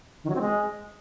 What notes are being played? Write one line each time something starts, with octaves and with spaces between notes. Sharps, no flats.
D#3
F#3
C4
G#3